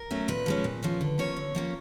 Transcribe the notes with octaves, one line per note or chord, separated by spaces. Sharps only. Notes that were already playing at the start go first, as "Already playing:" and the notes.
Already playing: A#4
F#3 A3 C#4
A#2 B4
F3 G#3 C#4
A#2
F3 G#3 C#4
D3
F3 A#3 C#4 C#5
D3
F3 A#3 C#4